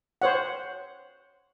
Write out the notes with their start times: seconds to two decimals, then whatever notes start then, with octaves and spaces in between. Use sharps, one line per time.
0.22 C5 C#5 F#5